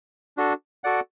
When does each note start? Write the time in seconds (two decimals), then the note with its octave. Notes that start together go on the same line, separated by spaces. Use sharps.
0.37 D4 F#4 A4
0.84 F#4 A4 D5 F#5